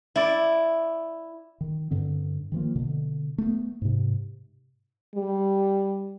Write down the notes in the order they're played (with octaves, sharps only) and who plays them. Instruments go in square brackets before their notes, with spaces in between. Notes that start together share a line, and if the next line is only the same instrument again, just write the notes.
[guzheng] E4 D5
[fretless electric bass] D#3
G2 D3 C4
D#3 F3 A#3
B2 D3
A3 B3
G#2 C3
[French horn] G3